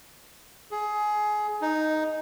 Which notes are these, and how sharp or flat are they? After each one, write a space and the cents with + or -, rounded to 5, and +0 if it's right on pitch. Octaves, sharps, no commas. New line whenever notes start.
G#4 +20
D#4 +0